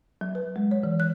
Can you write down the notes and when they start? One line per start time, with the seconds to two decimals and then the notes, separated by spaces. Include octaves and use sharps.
0.21 F#3
0.35 B4
0.56 G#3
0.71 C#5
0.83 E3
1.00 F#6